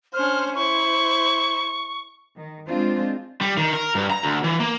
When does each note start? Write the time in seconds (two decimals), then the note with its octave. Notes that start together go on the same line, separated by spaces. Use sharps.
0.14 C#4 D4 C5 F6
0.55 E4 C5 C#6
2.36 D#3
2.68 G#3 C4 D4 F4 C5
3.41 G3
3.57 D#3
3.74 A#4
3.95 G2
4.10 A#5
4.23 D2
4.44 E3
4.59 A#3